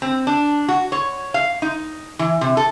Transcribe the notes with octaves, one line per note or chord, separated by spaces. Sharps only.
C4
D4
F#4
C#5
F5
D#4
E3
C3
A4